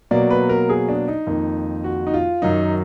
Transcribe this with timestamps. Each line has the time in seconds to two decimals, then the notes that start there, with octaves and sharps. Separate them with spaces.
0.11 B2 F#3 A#3 D5
0.30 B4
0.49 A#4
0.69 G#4
0.89 D4
1.08 D#4
1.27 F2 D#3 A#3
1.84 F#4
2.07 D#4
2.14 F4
2.42 F#2 D#3 F#3 D#4